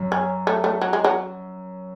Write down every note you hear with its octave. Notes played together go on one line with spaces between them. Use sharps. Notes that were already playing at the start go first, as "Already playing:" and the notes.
Already playing: F#2
C#4
A3
A3
F#3
G#3
F#3